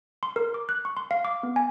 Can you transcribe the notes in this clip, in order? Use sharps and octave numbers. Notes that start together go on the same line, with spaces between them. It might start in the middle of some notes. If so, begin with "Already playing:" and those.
C6
A#4
D6
F#6
C#6
C6
F5
D6
B3
G#5